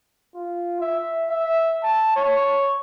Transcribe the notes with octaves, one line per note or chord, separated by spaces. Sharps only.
F4
E5
E5
A5
C#5